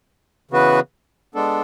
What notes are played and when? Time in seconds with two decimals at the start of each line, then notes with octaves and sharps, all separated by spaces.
0.51 C#3 E3 B3 F#4 B4
1.35 G#3 B3 D4 A4